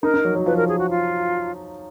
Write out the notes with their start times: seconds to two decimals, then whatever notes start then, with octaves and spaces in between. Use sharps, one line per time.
0.03 D#4 A#4
0.14 D#4
0.25 F#3
0.35 F#3
0.46 F3 B4
0.57 A#4
0.69 G#4
0.79 F#4
0.90 F4